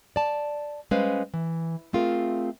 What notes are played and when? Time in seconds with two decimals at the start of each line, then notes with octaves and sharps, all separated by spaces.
0.16 D5 A5
0.91 G3 G#3 C#4 B4 C5 F5
1.34 E3
1.93 A3 C4 F4 G#4 A#4